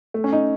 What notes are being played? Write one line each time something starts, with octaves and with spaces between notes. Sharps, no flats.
A3
C#4
D#4